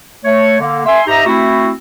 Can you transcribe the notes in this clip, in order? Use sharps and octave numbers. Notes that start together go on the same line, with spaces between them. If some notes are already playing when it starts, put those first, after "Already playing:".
A3 C#5
D3 A#3
E5 G#5 C6
G#2 D#4 G4 D#5 E5 A#5
A3 C4 E4 F#4